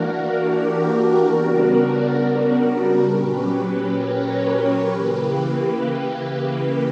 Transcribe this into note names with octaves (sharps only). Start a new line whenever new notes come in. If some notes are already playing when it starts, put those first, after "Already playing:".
Already playing: E3 A#3 D4 F#4 A#4
G4
C#3 G3 B3 D4 F#4 A#4
F#4 A#4
A#2 F#3 C#4 G4 B4
A#4 C#5
G4 B4
C#3 E3 A#3
G4